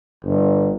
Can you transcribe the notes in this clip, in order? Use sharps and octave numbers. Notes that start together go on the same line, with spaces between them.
G1